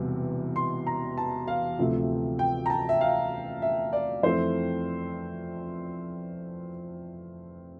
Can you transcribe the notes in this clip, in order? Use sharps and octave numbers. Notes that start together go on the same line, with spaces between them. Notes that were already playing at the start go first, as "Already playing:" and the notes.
Already playing: E1 E2 C3 G3
C6
A#5
A5
F5
D2 C3 F3 A3 C4
G5
A#5
A5
E5
F5
E5
D5
F2 E3 A3 C4 C5